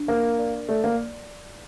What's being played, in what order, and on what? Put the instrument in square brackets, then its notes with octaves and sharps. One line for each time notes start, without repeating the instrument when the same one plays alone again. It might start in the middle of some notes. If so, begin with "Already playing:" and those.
Already playing: [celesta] D4
[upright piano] A#3 [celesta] A#4
[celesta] D5
[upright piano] A3 [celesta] D5
[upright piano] A#3